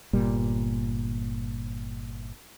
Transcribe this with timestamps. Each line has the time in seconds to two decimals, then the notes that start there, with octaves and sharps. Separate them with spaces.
0.13 G1 A#2 G3